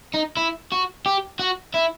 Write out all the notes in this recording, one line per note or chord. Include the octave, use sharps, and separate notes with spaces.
D#4
E4
F#4
G4
F#4
E4